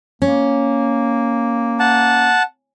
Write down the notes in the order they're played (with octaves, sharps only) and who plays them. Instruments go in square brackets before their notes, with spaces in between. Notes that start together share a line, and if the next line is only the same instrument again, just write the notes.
[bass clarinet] A#3 [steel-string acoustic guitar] C#4
[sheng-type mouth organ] F#5 A5